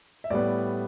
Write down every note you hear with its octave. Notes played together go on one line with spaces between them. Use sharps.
E5
A2 G3 B3 D5